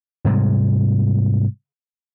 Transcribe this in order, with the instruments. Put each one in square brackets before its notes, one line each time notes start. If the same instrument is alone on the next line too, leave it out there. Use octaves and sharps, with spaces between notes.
[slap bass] G#2 C3 G3 G#3